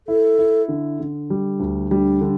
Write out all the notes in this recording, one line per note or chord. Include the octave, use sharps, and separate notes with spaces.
E4 A4
E4
D3
D3
G3
D2
G3 D4
D3